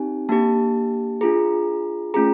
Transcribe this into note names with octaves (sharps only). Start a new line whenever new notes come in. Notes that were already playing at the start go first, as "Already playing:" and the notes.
Already playing: C4 D#4 G4 G#5
A#3 D4 G4 A5
D4 F4 G#4 A#5
A3 C#4 F4 G#4 A#5